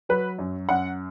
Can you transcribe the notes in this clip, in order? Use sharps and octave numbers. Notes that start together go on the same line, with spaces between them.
F#3 B4
F#2
F#2 F#5